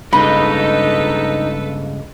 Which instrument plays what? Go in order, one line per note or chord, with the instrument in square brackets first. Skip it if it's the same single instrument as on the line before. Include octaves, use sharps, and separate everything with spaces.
[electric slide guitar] G2 C#3 G#3 [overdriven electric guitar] D#4 [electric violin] A4 B4 [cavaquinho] B5